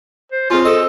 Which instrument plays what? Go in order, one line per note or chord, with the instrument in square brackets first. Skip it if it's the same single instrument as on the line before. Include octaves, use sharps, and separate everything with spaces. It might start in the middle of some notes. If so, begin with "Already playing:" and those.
[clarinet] C5
[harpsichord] G#3 C4 C#4 [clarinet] F4
[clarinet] A4 [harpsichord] C5 D#5